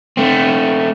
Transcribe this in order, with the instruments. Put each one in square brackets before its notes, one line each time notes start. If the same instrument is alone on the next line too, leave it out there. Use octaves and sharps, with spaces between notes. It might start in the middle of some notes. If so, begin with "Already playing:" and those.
[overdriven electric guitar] A3 C4